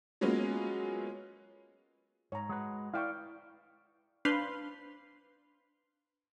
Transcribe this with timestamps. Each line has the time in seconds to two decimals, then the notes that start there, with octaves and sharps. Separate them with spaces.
0.21 F#3 G#3 A#3 B3 C#4 F4
2.32 G#2 C#5 A#5
2.49 G#3 F#4 B4
2.94 E4 B4 D5 F5 G5 C#6
4.25 D4 B4 C5 F5 B5 C6